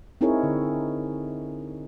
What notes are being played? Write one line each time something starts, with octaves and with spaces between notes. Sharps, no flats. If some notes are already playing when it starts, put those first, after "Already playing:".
C4 D#4 E4 G#4 A#4 C#5
D3